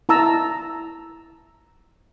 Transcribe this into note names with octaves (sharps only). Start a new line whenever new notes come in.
E4 A5 A#5 E6